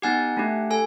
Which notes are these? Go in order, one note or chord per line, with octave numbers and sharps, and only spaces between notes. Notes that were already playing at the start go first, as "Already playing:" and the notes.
B3 D#4 G4 F#5 G#5
A3 D4 G4
A4 G#5